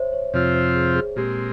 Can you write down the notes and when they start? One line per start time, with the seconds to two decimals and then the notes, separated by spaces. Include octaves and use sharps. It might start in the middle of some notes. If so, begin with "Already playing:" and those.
Already playing: C5 C#5 E5
0.13 C#5
0.34 F2 C3 F3 C4 F4 C#5
0.55 C5
0.76 G#4
0.96 G#4
1.16 A#2 G#3 C4 G4